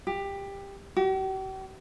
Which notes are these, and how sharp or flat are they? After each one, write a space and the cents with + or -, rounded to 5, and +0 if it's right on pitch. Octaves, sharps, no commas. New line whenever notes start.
G4 +15
G4 -45